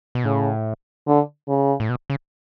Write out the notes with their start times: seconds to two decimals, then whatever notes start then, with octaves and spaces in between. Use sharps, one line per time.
0.15 B2
0.24 A2 C#3
1.07 D3
1.48 C#3
1.80 A2
1.89 B2
2.10 C#3